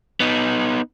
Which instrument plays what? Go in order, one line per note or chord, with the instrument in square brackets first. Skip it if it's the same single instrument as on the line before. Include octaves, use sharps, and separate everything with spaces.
[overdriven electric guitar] B3 D#4